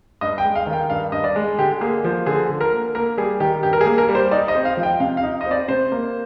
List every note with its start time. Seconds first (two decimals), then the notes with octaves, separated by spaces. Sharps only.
0.21 G2 D#5
0.38 G5
0.44 G#3
0.55 F5
0.67 D#3
0.73 G5
0.90 G2 F5
1.12 G2 D#5
1.24 D5
1.36 G#3
1.58 D3 G4
1.81 A#3 G#4
2.04 F3
2.26 D3 G#4
2.49 D3
2.61 A#4
2.73 A#3
2.95 A#3 A#4
3.17 G3 G#4
3.40 D#3 G4
3.63 G2 G4
3.73 A#4
3.81 G#4
3.86 A#3
3.98 A#4
4.09 G3
4.15 C5
4.31 D#4 D5
4.48 D#5
4.55 C4
4.65 F5
4.77 F3
4.83 G5
5.00 C3 F5
5.17 F5
5.23 D#4
5.41 D#5
5.46 C4 D5
5.68 C3 C5
5.92 A#3